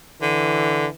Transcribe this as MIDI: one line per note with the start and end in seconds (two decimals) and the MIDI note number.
0.22 0.87 50
0.22 0.92 52